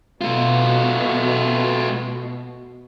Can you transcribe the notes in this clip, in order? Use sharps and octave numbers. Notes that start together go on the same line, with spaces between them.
B2 A3 F4